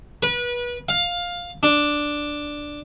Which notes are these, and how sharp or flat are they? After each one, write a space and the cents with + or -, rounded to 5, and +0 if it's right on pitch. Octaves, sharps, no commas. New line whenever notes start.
B4 -30
F5 +10
D4 +0